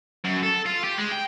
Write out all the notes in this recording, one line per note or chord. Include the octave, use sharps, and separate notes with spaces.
F#2
A4
F4
G4
G#3
G5